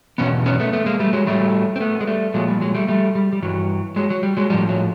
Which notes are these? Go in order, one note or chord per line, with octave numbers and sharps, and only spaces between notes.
E2 B2 F#3 B3 C#4
B3 C#4
A3 B3
A3 B3
G#3 A#3
G3 A3
F#3 G#3
A2 F#3 G3 A3
C4
A3 B3
G#3
G3 A3
A#2 F3 F#3 G#3
G3
F#3 G#3
G3 A3
G3 A3
G3
G3
G2 E3 F#3
F#3 G#3
F#3
G3
F#3 G#3
A2 F3 G3
F#3